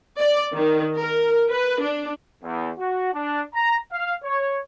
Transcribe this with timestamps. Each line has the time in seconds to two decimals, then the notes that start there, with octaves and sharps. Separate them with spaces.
0.20 D5
0.55 D#3
0.98 A#4
1.51 B4
1.82 D4
2.43 E2
2.79 F#4
3.14 D4
3.54 A#5
3.92 F5
4.23 C#5